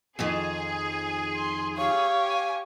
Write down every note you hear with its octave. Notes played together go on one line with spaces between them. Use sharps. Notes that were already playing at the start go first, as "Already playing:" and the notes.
F2 D#3 F3 G#4
C6
G4 C#5 F5
G#5